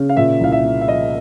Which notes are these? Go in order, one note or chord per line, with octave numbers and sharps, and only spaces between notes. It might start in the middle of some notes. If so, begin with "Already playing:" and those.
Already playing: C#3
F5
A#2 E5
C2 F5
E5
A#3
E5
F3 D#5